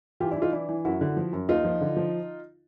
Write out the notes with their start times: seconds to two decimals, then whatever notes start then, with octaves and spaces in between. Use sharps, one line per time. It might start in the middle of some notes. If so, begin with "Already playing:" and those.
0.20 E3 F4 G4
0.31 D4 E4
0.36 E3
0.42 D#4 F4
0.52 E3 D4 E4
0.69 E3
0.85 F#2 E4 F#4
1.01 D3
1.17 F3
1.33 F#2
1.49 D#2 D#4 F4
1.65 F3
1.81 D3
1.97 F3